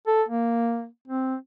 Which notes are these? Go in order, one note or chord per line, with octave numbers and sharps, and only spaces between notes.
A4
A#3
C4